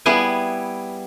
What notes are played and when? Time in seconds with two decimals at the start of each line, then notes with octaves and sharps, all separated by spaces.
0.06 G3 B3 E4 G#4 G#5